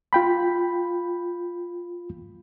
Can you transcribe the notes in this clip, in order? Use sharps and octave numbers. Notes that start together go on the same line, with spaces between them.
F4 G5 B5